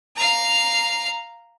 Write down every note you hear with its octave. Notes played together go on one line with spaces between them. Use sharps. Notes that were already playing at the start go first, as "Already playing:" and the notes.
F5 A#5